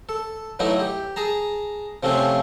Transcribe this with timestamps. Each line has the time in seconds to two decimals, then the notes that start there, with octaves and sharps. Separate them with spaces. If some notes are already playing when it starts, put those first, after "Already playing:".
0.09 A4
0.59 E3 F#3 A3 D#4 E4
0.79 G4
1.16 G#4 A5 A#5
2.03 C3 F3 A3 C4 C#4 F4